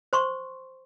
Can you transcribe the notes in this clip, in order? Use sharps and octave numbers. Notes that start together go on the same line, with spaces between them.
C5 C6 C#6